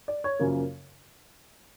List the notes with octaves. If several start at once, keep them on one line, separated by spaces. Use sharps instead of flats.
D5
C#5
F#2 C#3 F3 A#3